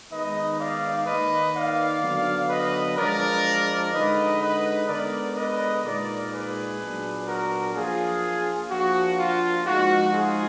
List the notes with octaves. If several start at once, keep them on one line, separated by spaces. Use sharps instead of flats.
D#3 G#3 B3 D#4 B4 D#5
D5 F5
D#3 A#3 D#4 B4 D#5
D5 F5
D3 F#3 B3
B4 D#5
F3 G#3 D4 A#4 D5
D3 G#3 D#4 B4 D#5
B4 D#5
D3 G#3 B3 A#4 D5
B4 D#5
A#2 G#3 D#4 A#4 D5
G#4 B4
A#2 F#3 B3 D4
F#4 A#4
F3 A#3 D4 F4 G#4
F3 A#3 D4 F#4
F4
F3 G#3 D#4 F#4
F4 G#4